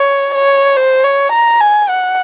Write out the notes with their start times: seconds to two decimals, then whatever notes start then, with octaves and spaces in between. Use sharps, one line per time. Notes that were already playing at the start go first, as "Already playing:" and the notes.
Already playing: C#5
0.34 C#5
0.76 C5
1.04 C#5
1.32 A#5
1.61 G#5
1.89 F#5